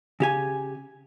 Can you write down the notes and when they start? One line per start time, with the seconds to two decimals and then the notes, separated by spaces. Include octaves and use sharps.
0.20 C#3 G4 G#5